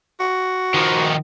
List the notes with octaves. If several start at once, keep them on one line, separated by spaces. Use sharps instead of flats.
F#4
D#3 F3